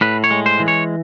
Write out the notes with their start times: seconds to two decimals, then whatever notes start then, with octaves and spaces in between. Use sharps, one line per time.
0.01 A2 B4
0.24 C#5
0.31 G#3
0.46 C5
0.60 E3
0.68 C#5